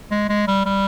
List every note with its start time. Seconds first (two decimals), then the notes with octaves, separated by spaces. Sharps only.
0.11 G#3
0.29 G#3
0.48 G3
0.66 G3